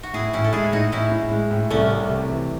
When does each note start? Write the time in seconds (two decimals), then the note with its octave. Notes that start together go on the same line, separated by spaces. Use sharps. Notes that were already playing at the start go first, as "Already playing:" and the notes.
0.03 F#4
0.13 A2 E4 G#4
0.33 A2 C#4 E4
0.44 A4
0.53 G#3 E4 G#4
0.73 A2 D#4 F#4
0.92 A2 C#4 E4
1.12 A2
1.31 G#3
1.51 A2
1.70 C2 A3 C#4
1.91 C3
2.10 C3
2.29 E3